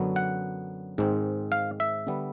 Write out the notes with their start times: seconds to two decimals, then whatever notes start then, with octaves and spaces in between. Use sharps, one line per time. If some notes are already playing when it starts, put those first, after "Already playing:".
Already playing: F#2 D3 F#3 B3
0.16 F#5
0.98 G#2 D#3 G#3 C4
1.52 F5
1.80 E5
2.07 D3 G3 B3